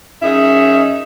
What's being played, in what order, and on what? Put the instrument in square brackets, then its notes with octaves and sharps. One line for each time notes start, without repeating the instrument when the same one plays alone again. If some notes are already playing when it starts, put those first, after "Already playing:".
[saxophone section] F#2 C#4 D#4 G#4 D#5 E5